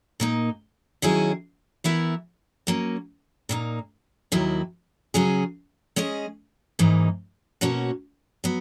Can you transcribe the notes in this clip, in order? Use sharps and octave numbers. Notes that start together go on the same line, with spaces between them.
A#2 A#3 D#4
D#3 F#3 C#4 E4 G#4
E3 B3 E4 A#4 E5
F#3 A#3 C#4
A#2 A#3 D#4
D#2 D#3 F#3 A#3 E4
C#3 F#3 C#4 G#4
G#3 C#4 G#4 D#5
G#2 E3 A#3 D#4
B2 A#3 C#4 F#4 C#5
F#3 B3